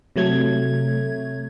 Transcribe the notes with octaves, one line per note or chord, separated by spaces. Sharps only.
C3 F#3 A3 G#6